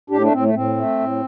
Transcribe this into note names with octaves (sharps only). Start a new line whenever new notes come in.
A2 D4 G4
A3 D4
A2 C4
A3
A2 C4
A3
A2